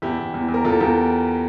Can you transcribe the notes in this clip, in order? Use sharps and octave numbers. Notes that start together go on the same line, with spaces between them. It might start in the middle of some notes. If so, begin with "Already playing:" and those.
E2 E4 G4
E2
E2
E2
A#4
E2 F4 A4
E2 G4 A#4